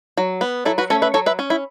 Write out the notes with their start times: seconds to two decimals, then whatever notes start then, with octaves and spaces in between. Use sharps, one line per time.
0.17 F#3
0.41 B3
0.65 F#3 E4 A4
0.78 F#4 B4
0.90 A3 C#4 A4 C#5
1.02 B4 E5
1.14 F#3 A4 C#5
1.26 B4 E5
1.39 C#4
1.50 E4